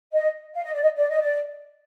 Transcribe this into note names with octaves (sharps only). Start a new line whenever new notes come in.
D#5
F5
D#5
D5
D#5
D5
D#5
D5